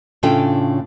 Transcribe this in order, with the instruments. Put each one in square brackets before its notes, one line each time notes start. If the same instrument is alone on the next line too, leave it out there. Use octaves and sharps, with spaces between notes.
[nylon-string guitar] A2 C#3 D4 F4 A4 G5